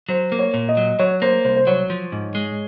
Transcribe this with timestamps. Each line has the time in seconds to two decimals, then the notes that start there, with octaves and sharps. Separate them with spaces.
0.09 F#3 C5
0.32 A#3
0.39 C#5
0.54 A#2
0.69 D#5
0.77 F#3
0.99 F#3 C#5
1.22 A#3 C5
1.45 C2 C5
1.56 C5
1.67 F#3 C#5
1.90 F3
2.12 G#2
2.35 G#3